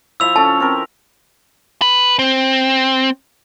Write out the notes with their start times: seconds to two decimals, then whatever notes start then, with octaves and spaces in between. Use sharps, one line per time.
0.20 F3 E4 E5 E6 F7
0.36 C#4 A4 A5
0.60 C4 A#4
1.82 B4
2.19 C4